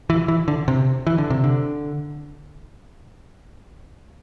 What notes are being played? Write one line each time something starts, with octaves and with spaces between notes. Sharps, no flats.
E3
E3
D3
C3
E3
D3
C3
D3